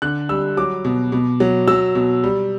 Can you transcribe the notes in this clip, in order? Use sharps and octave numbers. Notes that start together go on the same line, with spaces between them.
D3 F#6
G3 E6
F#3 D6
B2
B2
F#3
F#3 E6
B2
G3